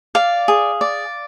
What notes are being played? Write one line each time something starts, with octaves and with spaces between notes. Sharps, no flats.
D5 F5
G#4
D5